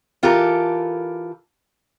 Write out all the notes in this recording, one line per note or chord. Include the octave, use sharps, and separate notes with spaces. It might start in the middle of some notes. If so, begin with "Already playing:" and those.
E3 F4 G4 A4 A#4